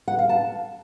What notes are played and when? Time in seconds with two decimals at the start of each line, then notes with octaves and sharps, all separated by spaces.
0.08 F#5
0.18 F5
0.29 A5